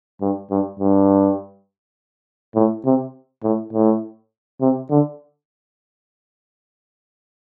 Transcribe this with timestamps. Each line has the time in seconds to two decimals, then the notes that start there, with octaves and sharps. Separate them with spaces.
0.21 G2
0.51 G2
0.79 G2
2.55 A2
2.85 C3
3.43 A2
3.73 A2
4.61 C3
4.90 D3